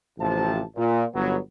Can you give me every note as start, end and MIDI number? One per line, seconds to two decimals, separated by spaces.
0.19 0.61 33
0.19 0.61 48
0.19 0.61 53
0.19 0.61 81
0.77 1.04 46
1.14 1.38 31
1.14 1.38 54
1.14 1.38 59